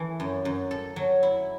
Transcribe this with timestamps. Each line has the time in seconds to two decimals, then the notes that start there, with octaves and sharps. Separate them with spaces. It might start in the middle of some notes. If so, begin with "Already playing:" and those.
Already playing: E3 A3
0.20 F#2
0.45 F#2
0.71 A4
0.96 F#3
1.23 E4